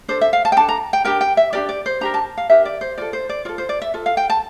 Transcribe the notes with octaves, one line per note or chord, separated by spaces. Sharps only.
D4 A4 C5
E5
F5
A5
G5
D4 A4 A5
A#5
G5
D4 G4 A#4 G5
G5
E5
D4 G4 A#4 D5
D5
C5
D4 G4 A#4 A#5
A5
F5
D4 G4 A#4 E5
D5
C5
F4 A4 D5
C5
D5
F4 A4 D5
C5
D5
E5
F4 A4
F5
G5
A5